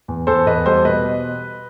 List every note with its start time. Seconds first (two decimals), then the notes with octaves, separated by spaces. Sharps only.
0.08 E2
0.27 E2 A4 C5
0.46 E2 B4 D#5
0.66 G3 A4 C5
0.85 B2 B4 D#5